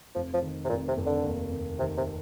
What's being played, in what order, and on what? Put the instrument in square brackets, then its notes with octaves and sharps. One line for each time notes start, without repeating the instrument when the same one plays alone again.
[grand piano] F1 [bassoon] F3
[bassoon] F3
[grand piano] D#3
[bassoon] C3
[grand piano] F1 [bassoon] A#2
[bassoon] C3
[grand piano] F1
[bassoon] D3
[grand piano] D#2
D#2
[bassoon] C3 [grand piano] D#3
[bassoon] C3